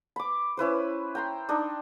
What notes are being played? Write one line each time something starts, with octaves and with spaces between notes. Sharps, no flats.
B5 D6
C#4 E4 B4 C5
G5 A#5 C6
D4 D#4 D#5